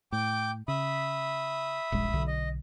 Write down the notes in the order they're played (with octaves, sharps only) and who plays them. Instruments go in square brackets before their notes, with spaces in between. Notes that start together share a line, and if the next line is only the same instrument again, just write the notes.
[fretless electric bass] A2 [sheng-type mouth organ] G5 D6
[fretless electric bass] C#3 [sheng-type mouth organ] E5 B5 D#6
[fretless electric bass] D#1 A#1 G#3
B1 D3
[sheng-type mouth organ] D#5